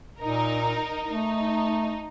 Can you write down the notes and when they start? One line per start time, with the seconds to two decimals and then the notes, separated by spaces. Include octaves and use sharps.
0.20 A#2 D#4 A#4
1.10 A3 D#4